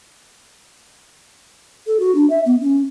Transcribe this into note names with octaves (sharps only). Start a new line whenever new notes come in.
A4
F#4
D4
E5
B3
C#4